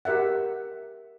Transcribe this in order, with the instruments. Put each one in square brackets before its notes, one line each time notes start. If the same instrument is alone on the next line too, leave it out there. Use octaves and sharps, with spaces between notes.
[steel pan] G4 A#4 E5 F#5